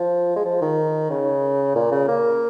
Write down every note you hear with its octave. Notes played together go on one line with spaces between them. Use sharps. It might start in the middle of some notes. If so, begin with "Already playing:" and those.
Already playing: F3
G#3
F3
D#3
C#3
A#2
C#3
A#3